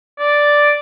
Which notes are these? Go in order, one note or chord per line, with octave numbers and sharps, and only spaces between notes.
D5